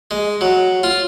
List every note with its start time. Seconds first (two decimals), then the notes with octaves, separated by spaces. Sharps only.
0.11 G#3
0.41 F#3
0.83 F4